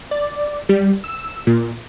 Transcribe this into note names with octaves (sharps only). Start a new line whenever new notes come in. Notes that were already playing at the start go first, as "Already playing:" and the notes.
D5
G3
E6
A#2